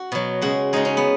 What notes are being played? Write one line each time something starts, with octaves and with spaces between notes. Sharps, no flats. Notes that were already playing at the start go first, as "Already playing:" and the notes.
Already playing: F#4
B2 F#3
C#3 G#3 F#4
C#3 G#3 D#4
C#4
B3